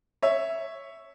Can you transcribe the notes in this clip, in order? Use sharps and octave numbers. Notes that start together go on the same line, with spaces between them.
C#5 E5